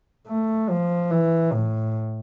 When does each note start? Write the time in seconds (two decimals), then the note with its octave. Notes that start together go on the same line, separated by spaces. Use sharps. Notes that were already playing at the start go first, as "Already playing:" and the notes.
0.28 A3
0.70 F3
1.11 E3
1.53 A2